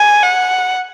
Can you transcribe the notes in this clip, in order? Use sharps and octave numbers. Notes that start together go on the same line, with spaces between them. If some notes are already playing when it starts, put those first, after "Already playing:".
Already playing: G#5
F#5